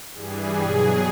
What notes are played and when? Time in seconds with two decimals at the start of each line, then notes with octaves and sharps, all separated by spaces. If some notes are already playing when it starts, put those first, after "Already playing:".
0.13 G2 E3 G3 G#4
0.59 B2 F#3